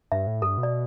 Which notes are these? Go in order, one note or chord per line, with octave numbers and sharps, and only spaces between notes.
G2 E5
A2
G2 A4
B2
D5